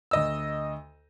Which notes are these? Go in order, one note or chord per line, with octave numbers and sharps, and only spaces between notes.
D2 D#5 E6